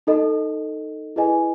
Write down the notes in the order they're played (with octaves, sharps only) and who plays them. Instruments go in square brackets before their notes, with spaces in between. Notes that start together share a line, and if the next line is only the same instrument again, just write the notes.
[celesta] D#4 A4 D#5
E4 G#4 B4 D#5 G#5